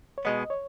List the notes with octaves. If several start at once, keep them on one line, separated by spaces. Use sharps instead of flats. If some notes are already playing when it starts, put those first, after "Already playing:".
C#5
B2 G#3 B3 D#5
C#5